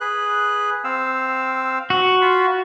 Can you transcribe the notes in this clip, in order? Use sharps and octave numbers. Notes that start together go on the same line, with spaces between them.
G#4 B4 F#6
C4 F5 E6
F#4 F#5
F4 F5 B5